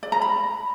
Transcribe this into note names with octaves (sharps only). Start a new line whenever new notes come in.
D5
A#5
B5